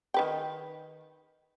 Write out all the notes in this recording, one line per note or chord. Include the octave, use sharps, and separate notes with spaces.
D#3 B4 G5